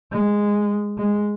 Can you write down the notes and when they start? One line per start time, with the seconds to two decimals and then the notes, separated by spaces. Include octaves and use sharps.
0.11 G#3
0.98 G#3